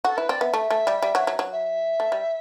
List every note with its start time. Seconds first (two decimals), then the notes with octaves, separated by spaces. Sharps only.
0.05 F#4 A4
0.17 E4 B4
0.29 C4 D5
0.41 B3 E5
0.54 A3
0.71 A3
0.87 G3
1.02 G3
1.15 F#3
1.27 F#3
1.39 F#3
1.52 E5
2.00 A3
2.12 G3